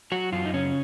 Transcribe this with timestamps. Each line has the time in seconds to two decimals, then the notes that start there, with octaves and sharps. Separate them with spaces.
0.12 F#3 F#4
0.32 F#2 F4
0.46 D#4
0.54 C#3 C#4